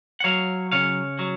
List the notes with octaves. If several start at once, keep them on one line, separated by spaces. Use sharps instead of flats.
F#5
F#3 C#5 F5
C#3 C#5 F5
F#3